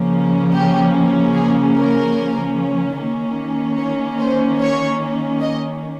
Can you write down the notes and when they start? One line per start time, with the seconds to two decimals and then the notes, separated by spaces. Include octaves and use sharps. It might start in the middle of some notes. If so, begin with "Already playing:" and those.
Already playing: C#3 F3 A#3 C#4
0.53 G4
1.34 G#4
1.75 A#4
2.97 D#3 A#3 C#4
3.78 C#5
4.19 C5
4.60 C#5
5.41 D#5